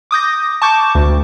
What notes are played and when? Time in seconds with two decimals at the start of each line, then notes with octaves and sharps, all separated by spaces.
0.11 D6 D#6 G6 A#6
0.62 A5 C#6 D6 G6
0.95 D2